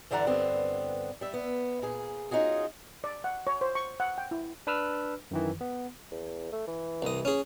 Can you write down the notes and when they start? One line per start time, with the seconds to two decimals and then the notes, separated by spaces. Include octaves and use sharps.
0.11 G2 D3 E3 D5 F#5 A#5
0.27 G2 D3 B3 C4
1.21 G3 E5
1.34 B3
1.82 A#2 G#4
2.31 C#4 D#4 F4 F#4 G#4
3.04 D5
3.24 F#5
3.47 C#5
3.61 C5
3.75 C#6
4.00 F#5
4.18 G5
4.31 E4
4.67 D4 B4 E6 F6
5.31 F#2 D#3 E3
5.61 B3
6.12 E2
6.52 A3
6.68 E3
7.02 C2 D#5
7.25 C#4 G#4